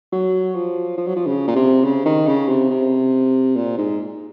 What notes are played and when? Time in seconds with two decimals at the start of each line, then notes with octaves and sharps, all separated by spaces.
0.12 F#3
0.55 F3
0.98 F3
1.07 F#3
1.16 F3
1.27 C#3
1.48 A#2
1.56 C3
1.84 C#3
2.06 D#3
2.27 C#3
2.48 C3
2.71 C3
3.57 A#2
3.78 G#2